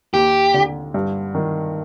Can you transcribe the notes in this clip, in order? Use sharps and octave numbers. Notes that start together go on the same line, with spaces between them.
D#2 G4
D3
G2
D#3